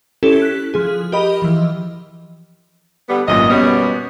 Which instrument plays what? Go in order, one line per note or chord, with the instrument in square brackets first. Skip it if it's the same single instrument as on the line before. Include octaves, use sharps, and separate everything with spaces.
[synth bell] C#4 E4 G4 A4
F#6 B6
F3 G#4
G4 A#4 D#5 B5
E3 F3
[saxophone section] D3 G3 B3
[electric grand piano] G#1 F#2 A#2 [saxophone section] D#5
[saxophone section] F#2 B2 G3 [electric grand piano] B3 C#4